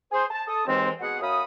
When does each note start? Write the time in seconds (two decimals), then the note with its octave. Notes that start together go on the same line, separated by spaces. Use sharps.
0.11 G#4 C5
0.31 A5
0.47 A4 A5 D#6
0.67 D#2 G#2 E3 G#3 C4
1.00 B2 G#4 F#5
1.21 F#2 F5 B5 D#6